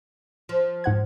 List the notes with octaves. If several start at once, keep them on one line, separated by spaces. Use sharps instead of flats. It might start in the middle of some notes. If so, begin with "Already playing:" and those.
F3
G#2 F#5 G#6